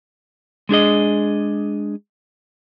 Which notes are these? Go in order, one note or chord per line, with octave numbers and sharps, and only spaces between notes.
G#3 D4 G#4 D#5